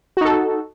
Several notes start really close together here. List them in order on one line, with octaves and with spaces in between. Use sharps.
F#4 D#4 A4